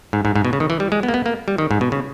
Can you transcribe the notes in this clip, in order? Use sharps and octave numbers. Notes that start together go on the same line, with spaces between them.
G#2
G#2
G#2
B2
C#3
D#3
E3
G3
G#3
B3
A#3
B3
A#3
G3
D#3
G#2
B2
C#3